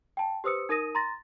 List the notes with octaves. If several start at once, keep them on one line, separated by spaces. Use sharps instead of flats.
G5 A5
G4 B4 C5 D#6 E6 C#7
D#4 A#4 D#6 A#6 D#7
A#5 C6 A6 A#6